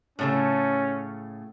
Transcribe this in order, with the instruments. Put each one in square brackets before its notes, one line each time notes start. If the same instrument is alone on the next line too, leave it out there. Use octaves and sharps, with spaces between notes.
[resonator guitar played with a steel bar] A2 C#3 A3 [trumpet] C#4